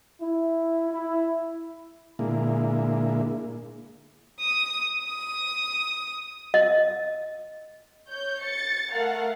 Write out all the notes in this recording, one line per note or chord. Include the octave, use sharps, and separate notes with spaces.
E4
E4
A#2 D3 G#3 A#3 E4
D#6
D#6
D#5
C#5 G6
A6 C#7
A3 A#4 F5 F#5